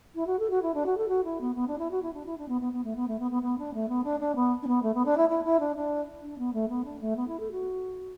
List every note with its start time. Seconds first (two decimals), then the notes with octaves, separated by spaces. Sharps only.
0.15 E4
0.27 F#4
0.39 A4
0.50 F#4
0.62 E4
0.74 D4
0.86 F#4
0.97 A4
1.08 F#4
1.24 E4
1.41 B3
1.55 B3
1.67 D4
1.78 E4
1.91 F#4
2.02 E4
2.13 D4
2.26 E4
2.38 D4
2.48 B3
2.61 B3
2.73 B3
2.84 A3
2.96 B3
3.08 A3
3.19 B3
3.31 B3
3.42 B3
3.58 D4
3.74 A3
3.89 B3
4.04 D4
4.20 D4
4.35 B3
4.62 D4
4.67 B3
4.82 A3
4.94 B3
5.05 D4
5.17 E4
5.29 E4
5.44 E4
5.60 D4
5.76 D4
6.22 D4
6.38 B3
6.53 A3
6.69 B3
6.85 D4
7.00 A3
7.16 B3
7.27 E4
7.40 A4
7.51 F#4